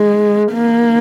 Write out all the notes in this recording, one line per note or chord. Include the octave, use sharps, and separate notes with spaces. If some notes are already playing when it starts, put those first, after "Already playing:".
Already playing: G#3
A#3